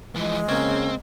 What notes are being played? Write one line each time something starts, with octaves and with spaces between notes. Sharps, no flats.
E3 F3 G#3
C#3 A#3 C4 C#4